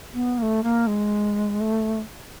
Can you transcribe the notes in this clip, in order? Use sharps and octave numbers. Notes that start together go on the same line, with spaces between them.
B3
A#3
A3
A#3
G#3
A3